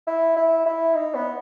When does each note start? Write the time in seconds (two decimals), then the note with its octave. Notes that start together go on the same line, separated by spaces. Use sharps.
0.07 E4
0.36 E4
0.66 E4
0.94 D#4
1.15 B3